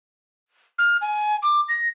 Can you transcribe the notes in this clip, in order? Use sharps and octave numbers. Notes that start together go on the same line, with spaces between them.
F6
G#5
D6
A#6